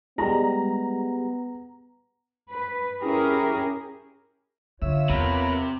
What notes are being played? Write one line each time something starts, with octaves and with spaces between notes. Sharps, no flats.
G3 G#3 B3 A#5
B4
C#4 E4 G4 G#4 A#4
D3 F4 C#5 E5
E2 C3 B3 A#4